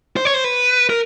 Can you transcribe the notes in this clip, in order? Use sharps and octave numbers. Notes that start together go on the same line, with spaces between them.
C5
C#5
C5
B4
A#4